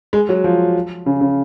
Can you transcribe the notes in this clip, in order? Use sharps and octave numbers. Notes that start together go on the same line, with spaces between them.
G#3
F#3
F3
C#3
C#3